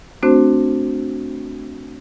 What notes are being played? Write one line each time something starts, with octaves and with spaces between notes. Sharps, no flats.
A3 C4 D4 F#4 C5